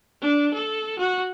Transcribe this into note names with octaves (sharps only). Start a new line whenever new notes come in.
D4
A4
F#4